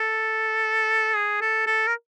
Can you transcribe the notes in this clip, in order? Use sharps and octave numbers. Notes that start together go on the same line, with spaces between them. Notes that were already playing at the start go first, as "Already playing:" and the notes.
Already playing: A4
G#4
A4
A4
A#4